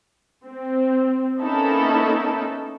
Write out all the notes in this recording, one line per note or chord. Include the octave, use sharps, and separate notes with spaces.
C4
A#3 B3 C#4 D#4 E4 A4